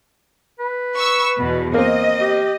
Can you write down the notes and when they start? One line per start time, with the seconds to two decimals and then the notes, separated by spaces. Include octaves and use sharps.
0.59 B4
0.97 C#6 E6
1.39 E2 B2
1.74 A#3 C4 D#5
2.21 G4